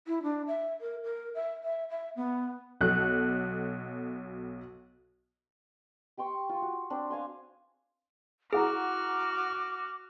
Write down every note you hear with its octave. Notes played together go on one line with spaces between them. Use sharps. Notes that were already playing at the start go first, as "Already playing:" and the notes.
E4
D4
E5
A#4
A#4
E5
E5
E5
B3
B1 B2 A4 F#6
G4 G5 C6 C#6
F4
F#4
C4 D4
F5 G#5 C6
E4 F#4 G#4 F#5 A#5 D6 F6